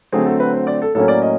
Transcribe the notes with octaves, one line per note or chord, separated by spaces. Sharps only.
D3 F#3 A3 C4 G#4
A4
B4
C5
D5
A4
A2 F#3 A#3 C#4 A4
D5
D#5